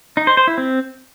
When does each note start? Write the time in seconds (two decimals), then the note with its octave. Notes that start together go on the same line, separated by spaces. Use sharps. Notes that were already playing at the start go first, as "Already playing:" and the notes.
0.17 D#4
0.27 C5
0.37 C5
0.47 E4
0.58 C4